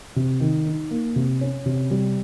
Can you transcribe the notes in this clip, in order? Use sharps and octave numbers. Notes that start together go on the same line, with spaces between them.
C3
D#3
D#4
A#3
C3
C#4
C3
G3